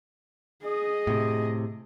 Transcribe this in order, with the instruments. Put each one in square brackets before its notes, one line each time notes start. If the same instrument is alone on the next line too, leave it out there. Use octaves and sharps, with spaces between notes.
[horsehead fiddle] G#4 D#5
[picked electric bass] A2 C3